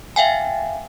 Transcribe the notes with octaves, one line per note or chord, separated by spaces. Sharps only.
E5 F5 G5 G#5